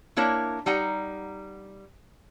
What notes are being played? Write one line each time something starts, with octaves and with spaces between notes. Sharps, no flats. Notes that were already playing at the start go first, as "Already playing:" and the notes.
A#3 D4 E4 A#4 C#5
G3 D#4 F#5 A#5